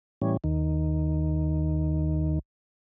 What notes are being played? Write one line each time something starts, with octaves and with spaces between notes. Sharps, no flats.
A2 E3 G3 C#4
D#2 D#3